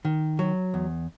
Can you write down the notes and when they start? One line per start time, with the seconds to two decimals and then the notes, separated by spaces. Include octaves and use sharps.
0.05 D#3
0.39 F#3
0.74 E2